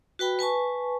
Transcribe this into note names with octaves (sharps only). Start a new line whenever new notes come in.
F#4 B4 G5 B5
B4 G#5 A5 C#6